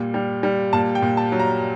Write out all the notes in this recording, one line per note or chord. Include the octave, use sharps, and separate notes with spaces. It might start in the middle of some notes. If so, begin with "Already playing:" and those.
Already playing: A#2 G3
G3
G3
A#2 A5
G5
A#2
A5
F#3
A#5